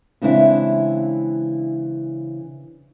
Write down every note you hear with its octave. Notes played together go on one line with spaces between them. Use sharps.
C#3 E3 G#3 C4 D4 E4